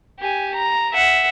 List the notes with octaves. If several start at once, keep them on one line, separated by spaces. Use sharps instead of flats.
G4 G#5
A#5
E5 F#5